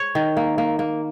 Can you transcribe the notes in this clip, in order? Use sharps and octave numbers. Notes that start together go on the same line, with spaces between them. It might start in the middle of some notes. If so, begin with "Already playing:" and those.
Already playing: C#5
D#3
A#3
A#3
A#3